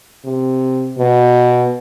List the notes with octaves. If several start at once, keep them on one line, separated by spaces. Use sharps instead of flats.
C3
B2